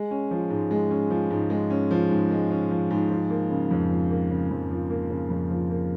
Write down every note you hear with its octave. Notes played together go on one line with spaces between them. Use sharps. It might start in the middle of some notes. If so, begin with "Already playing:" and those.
Already playing: G#3
C#4
F3
G#2
G#3
C#4
F3
G#2
G#3
C#4
F3
G#2
G#3
C#4
F3
G#2
F3
A#3
C#3
F2
F3
A#3
C#3
F2
F3
A#3
C#3
F2
F3
A#3